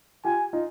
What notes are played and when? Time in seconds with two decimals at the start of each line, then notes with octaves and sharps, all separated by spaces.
0.24 F4 G4 G#5
0.53 D#4 F4